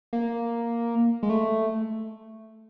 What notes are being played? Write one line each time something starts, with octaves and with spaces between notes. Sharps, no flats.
A#3
G#3
A3